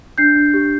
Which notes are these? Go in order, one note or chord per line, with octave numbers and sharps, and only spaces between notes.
D4 G6 C7
D4
G4